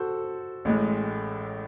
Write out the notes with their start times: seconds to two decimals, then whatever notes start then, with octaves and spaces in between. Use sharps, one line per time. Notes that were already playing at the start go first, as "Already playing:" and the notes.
Already playing: F#4 A4 C5
0.65 A1 A2 G#3